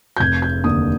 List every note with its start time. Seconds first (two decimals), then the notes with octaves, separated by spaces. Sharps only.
0.17 G6
0.20 F1 G#6
0.42 G6
0.64 D#2 D3 D#6